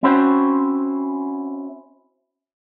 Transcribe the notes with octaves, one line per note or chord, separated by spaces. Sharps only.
C4 C#4 E4 F#4 C5